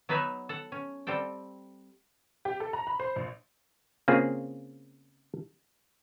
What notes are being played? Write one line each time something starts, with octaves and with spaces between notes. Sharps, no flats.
F#3 B3 D#4 B4 E5 G#5
A4 F#5
C#4
G3 C4 A4 G5
G4
A4
A#5
B5
C5
A#1
C#3 A#3 C4 F4 G#4